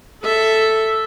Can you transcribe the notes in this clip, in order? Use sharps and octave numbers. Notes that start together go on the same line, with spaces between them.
A4 E5